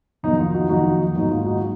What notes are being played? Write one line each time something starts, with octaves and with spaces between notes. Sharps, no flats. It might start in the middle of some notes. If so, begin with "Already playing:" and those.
F2 D#3 F#3 A#3 D#4
F4
D#4 F#4
F2 D#3 F#3 A#3 D#4 F#4
G#2 D#3 F#3 A#3 D#4
F4
D#4 F#4